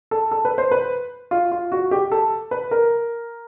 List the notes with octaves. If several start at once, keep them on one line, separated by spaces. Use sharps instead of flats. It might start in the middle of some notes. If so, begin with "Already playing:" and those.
A4
A4
B4
C5
B4
F4
F4
F#4
G4
A4
B4
A#4